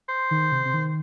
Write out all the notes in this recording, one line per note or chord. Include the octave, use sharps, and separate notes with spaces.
C5
D#3
C3
C3
D#3